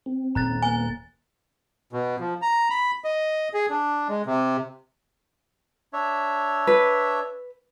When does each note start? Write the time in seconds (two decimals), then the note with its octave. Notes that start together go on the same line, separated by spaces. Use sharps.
0.06 C4
0.35 D#1 A#5 F#6 A6
0.62 A#3 B3 G#5
1.93 B2
2.20 F3
2.42 A#5
2.70 B5
3.04 D#5
3.54 G#4
3.70 D4
4.09 G#3
4.26 C3
5.93 D4 C#5 E5
6.67 B4